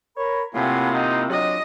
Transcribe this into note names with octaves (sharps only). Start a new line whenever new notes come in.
A#4 C#5 B5
A2 C3 A#3 E4 F4 F#5 G#5 G#6
D#4 F#5
C3 F#3 D4 F4 D#5